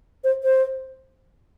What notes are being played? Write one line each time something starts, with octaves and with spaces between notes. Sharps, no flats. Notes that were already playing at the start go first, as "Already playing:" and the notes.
C5
C5